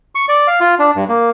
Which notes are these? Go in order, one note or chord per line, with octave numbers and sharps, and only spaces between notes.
C#6
D5
F5
F4
D4
G2
A#3